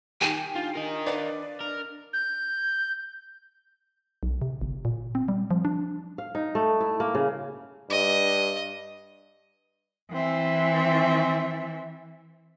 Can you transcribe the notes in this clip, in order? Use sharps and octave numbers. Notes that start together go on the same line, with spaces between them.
D#3 G4 G#5 D#7
D4 F4
A#4 D#5
B4 D5 F5
A#4
G6
B1
C3
G1
A#2
C4
G3
F3
D4
F5
D#4
A3
E4
A#3
C#3
G2 D#5
E3 C4 E5